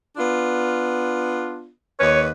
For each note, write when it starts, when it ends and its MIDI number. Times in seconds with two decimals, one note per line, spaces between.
0.17 1.70 59
0.17 1.70 62
0.17 1.70 65
2.00 2.31 39
2.00 2.31 71
2.00 2.22 73